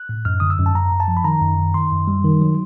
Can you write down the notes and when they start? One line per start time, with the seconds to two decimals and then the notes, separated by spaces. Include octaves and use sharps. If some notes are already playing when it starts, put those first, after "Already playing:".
Already playing: F#6
0.09 A2
0.25 F#2 F6
0.40 D3 D#6
0.50 E6
0.59 F#2
0.66 A5
0.75 F#2 A#5
0.92 F#2
1.00 A5
1.08 F3
1.17 B5
1.24 D#3 A#5
1.42 F#2
1.58 D#3
1.74 D#3 C6
1.92 F#2
2.08 G3
2.24 D#3
2.41 F#3